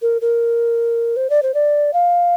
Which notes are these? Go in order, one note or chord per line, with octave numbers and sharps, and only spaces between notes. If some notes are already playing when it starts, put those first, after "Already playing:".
A#4
A#4
C5
D5
C5
D5
F5